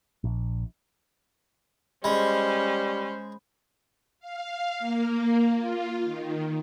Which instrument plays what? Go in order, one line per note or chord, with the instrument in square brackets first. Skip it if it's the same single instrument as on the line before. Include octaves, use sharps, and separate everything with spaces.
[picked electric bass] A#1
[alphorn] G3 [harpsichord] G#3 [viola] C#4 C5 [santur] B5
[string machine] F5
A#3
F4
D#3